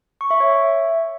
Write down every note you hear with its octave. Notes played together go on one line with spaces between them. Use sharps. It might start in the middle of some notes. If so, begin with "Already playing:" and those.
C#6
E5
C#5
E5